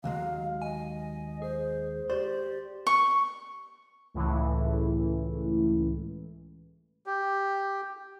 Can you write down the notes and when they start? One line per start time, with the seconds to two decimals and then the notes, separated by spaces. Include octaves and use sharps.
0.04 D#2 F#3 G#3 F5
0.62 D#5 G#5
1.42 G#4 C5
2.10 G4 C5 D5
2.87 C#6
4.14 C#2 A2 E3
7.06 G4